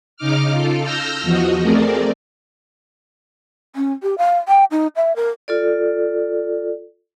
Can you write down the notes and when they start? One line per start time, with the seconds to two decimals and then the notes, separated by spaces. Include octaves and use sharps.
0.17 C#3 D#4 D6 F6
0.52 F4 A4
0.82 E6 F6 G6 A#6
1.22 E2 F3 F#4 D#5
1.62 A3 C4 G#4 A#4 D5
3.76 C#4
4.03 G4
4.18 F5
4.48 G5
4.71 D#4
4.96 E5
5.16 A#4
5.48 F4 A4 D5